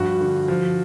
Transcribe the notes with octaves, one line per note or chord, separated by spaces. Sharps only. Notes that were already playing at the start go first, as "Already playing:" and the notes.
Already playing: G2 F3 F#4
D3
F3